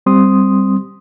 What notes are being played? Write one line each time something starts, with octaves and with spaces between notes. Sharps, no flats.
G3 C4 C6 D#6